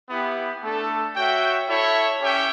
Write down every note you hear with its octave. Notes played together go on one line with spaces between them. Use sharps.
B3 E4 G4
A3 D4 A4
F#4 C#5 E5 G5
E4 A4 C#5 E5
C#4 G4 C#5 E5 G5